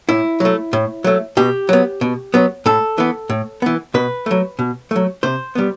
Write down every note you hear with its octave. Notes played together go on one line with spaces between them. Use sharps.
A2 E4
F#3 A3
A2
F#3 A3
B2 G4
F#3 B3
B2
F#3 B3
A2 A4
E3 B3
A2
E3 B3
B2 B4
F#3 A3
B2
F#3 A3
C3 C5
G3 B3